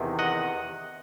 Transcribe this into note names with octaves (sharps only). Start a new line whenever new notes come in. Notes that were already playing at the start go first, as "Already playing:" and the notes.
Already playing: E2 C3 D#3
D#5 F#5